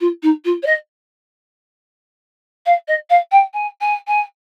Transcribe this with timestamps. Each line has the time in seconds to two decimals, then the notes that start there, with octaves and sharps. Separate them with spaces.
0.01 F4
0.23 D#4
0.45 F4
0.63 C#5
0.66 D#5
2.66 F5
2.88 D#5
3.10 F5
3.32 G5
3.54 G#5
3.81 G#5
4.08 G#5